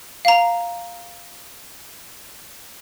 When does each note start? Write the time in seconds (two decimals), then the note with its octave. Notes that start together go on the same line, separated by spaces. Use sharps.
0.25 F5 A#5